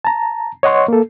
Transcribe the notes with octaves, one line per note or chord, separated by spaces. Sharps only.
A5 A#5
C#5 D#5 F#5 C6 C#6
A#3 A4